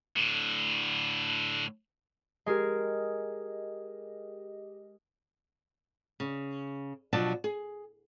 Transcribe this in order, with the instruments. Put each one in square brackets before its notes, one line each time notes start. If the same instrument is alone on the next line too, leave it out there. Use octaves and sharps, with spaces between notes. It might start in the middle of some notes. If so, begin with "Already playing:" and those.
[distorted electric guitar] A2 D3
[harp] G#3 G#4 A#4 [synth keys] G4 D#5
[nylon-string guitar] C#3
B2 F3 F#3 D4 A5
G#4